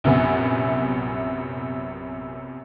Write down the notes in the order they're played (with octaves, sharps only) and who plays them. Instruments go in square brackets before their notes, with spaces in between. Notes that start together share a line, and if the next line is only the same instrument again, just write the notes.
[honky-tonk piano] A#1 F#2 C3 B3 G#5